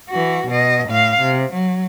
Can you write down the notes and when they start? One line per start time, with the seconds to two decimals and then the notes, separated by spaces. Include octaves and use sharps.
0.10 E3 F#4
0.48 B2 D#5
0.89 A2 F5
1.21 C3
1.53 F#3